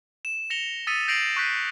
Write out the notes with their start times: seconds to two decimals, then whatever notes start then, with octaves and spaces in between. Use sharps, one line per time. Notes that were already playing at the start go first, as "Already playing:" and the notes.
0.25 E7
0.50 A#6 C#7 F7 G7
0.87 D#6 E6 A6 B6 C#7 D#7
1.08 G6 A#6 C7 D7 F7 F#7
1.36 C#6 F#6 G6 B6 C7